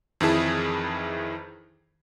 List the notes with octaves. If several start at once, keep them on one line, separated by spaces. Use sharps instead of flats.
F2 D#3 E3 E4 G#4 A5